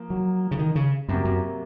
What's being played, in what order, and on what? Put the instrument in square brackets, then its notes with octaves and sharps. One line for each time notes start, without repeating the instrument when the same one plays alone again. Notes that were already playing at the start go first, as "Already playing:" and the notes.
Already playing: [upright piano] F3 A#3
[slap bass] F#3
C#3
D#3
C#3
[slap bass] F#2 [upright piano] C3 F#3 A#3
[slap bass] F#2